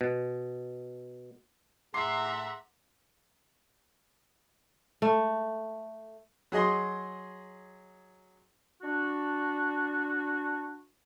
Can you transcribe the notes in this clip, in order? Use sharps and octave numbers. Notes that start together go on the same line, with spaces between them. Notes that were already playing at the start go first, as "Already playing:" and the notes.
B2
A2 G#4 E5 F#5 A#5 C6 D6 C7
A3
F#3 G#4 D#5 C6
D4 F#4